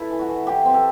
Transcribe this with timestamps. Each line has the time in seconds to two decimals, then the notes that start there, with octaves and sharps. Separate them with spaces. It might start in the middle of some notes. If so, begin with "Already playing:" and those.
Already playing: E4 A4 B4
0.10 E3
0.19 F#4
0.28 E3
0.47 E3 G4
0.65 C4
0.74 A4